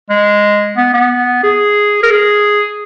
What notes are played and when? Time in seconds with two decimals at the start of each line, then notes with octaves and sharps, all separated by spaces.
0.09 G#3
0.77 B3
0.93 B3
1.43 G#4
2.03 A#4
2.10 G#4